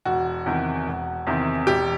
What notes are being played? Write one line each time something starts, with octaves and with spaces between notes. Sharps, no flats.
E1 F#4
E2 C3 D#3
E1
E2 C3 D#3
E1 G4